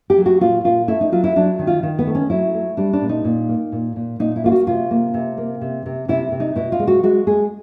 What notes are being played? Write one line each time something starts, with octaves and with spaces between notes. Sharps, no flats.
G4
F#3
F#4
A#2 F4
A#2 F4
A3 E4
D#4
F#3 F4
E4
F#3 D4
D#3
F4
D#3
B3
A3
C#4
F#3 E4
A3
G3 D4
D4
A#2
D#4
A#2
A#3
A#2
A#2
A#2 D#4
E4
A#3 F4
F#4
C3 F4
A#3
C3
A#3
C3
C3
C3 E4
C3
D#4
B2 E4
F4
G#3
F#4
G#3 F#4
G#3 G#4